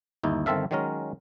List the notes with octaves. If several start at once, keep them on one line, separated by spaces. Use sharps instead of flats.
G1 D#2 D#4 E4
G1 D#3 C4 A4 E5 F5
D#3 F#3 G#3 C#4 A#4